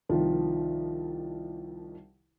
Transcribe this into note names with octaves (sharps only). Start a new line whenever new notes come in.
C2 D#3 F3